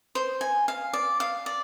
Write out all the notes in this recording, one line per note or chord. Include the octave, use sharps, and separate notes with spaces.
C5
G#5
F5
D5
F5
D5